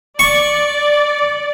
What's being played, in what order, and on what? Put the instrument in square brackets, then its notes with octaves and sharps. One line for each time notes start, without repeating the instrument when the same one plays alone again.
[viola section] D5 [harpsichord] C#6